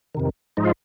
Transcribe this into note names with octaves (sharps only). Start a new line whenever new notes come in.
F2 C3 D#3
G#2 F3 G#3 D#4
F4